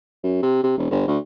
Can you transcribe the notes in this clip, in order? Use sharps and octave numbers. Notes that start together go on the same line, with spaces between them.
F#2
C3
C3
E1
G1
D2